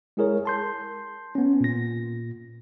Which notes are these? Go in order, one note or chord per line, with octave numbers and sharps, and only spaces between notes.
G#3 E4 G#4 A#4 C#5
A5 C6 G6
B3 C#4
A#2 A#6